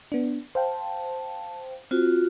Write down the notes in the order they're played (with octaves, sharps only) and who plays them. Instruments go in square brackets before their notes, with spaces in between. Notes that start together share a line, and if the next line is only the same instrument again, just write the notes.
[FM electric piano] B3 D4
[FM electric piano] C5 F5 G5 [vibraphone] A5
[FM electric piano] C4 [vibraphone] F4 F#4